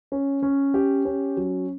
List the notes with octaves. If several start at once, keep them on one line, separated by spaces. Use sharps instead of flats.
C#4
C#4
G4
C#4
F#3